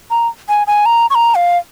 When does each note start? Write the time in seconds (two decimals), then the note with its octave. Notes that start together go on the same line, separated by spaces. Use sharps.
0.11 A#5
0.49 G#5
0.67 G#5
0.86 A#5
1.10 C#6
1.15 A#5
1.35 F5